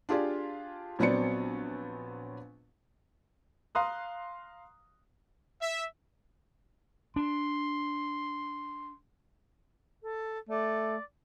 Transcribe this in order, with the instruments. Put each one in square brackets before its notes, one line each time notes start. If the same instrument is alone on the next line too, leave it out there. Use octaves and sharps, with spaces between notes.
[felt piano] D4 F4 G4 G#4 D5
A#1 F#3 B3 C4 D5 C#7
[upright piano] F5 A#5 C6 D#6 F#6
[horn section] E5
[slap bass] D4 [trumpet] C6
[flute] A4
[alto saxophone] A3 [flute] D5